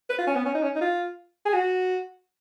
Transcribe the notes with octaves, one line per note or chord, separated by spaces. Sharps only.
B4
F4
C#4
B3
C#4
D#4
C#4
D#4
F4
G#4
F#4